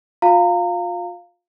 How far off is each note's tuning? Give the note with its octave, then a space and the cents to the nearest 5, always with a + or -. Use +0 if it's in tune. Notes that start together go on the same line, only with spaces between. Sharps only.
F4 +30 F5 +0 A#5 -30